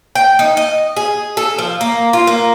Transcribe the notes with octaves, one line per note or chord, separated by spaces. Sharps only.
G5
D#4
D#5
G#4
A4
F3
A#3
F4
A#3